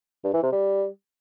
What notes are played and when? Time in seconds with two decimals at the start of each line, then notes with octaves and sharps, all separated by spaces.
0.24 G2
0.34 E3
0.43 C3
0.53 G3